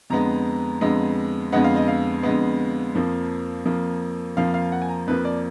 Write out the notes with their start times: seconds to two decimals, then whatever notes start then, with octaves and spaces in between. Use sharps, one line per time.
0.10 F2 D3 G#3 B3 A#5
0.81 F2 D3 G#3 B3
1.52 F2 D3 G#3 B3 F#5
1.64 F5
1.76 D#5
1.88 F5
2.23 F2 D3 G#3 B3
2.95 F2 F3 A#3
3.65 F2 F3 A#3
4.36 F2 F3 A#3 F5
4.54 F5
4.72 F#5
4.82 G#5
4.89 A#5
5.07 F2 F3 A#3 B4
5.25 D5